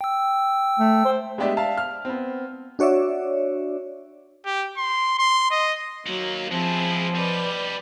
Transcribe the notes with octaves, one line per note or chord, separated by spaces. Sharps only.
G5 E6
A3
C5
G#3 B3 D4 G4 D5 E5
E5 F5 A5
F6
B3 C4
D4 F#4 C#5 D5 E5
G4
C6
C6
D#5
F#3 A#3 D#4
F3 G#3 C4 E4 F4 G#4
G3 B4 D5 D#5 B5